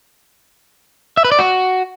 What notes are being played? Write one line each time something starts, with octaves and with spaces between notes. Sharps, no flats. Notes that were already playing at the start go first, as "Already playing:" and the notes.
E5
B4
D5
F#4